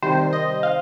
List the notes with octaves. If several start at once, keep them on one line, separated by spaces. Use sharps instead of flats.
C3 D#3 G3 C5
D#5
F5